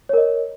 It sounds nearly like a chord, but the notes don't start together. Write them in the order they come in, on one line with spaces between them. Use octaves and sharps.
C#5 A#4 D#5